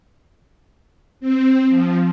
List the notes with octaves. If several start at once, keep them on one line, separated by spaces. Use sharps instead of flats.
C4
F3